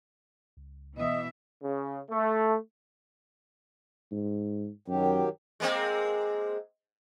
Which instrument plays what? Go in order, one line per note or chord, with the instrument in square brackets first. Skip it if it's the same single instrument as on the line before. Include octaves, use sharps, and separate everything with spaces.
[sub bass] C#2
[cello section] B2 E3 E5 [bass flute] D#5
[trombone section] C#3
A3
[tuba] G#2
[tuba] F#2 [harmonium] D#3 F#3 G4
[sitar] G#3 A#3 C4